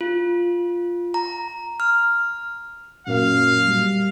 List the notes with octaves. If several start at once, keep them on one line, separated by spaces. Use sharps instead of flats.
F4
A#5
F6
F#2 A#2 A#3 F5
G3